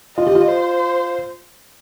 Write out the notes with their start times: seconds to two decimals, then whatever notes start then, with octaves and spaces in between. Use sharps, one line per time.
0.17 F4 D#5
0.27 G4
0.35 F4
0.48 C5